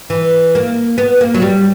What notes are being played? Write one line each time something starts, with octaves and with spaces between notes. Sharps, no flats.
E3
A#3
B3
A#3
F#3
G3